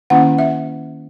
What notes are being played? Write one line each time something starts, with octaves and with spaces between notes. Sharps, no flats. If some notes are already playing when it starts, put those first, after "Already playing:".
D#3 A#3 C#4 E4 F#5
E5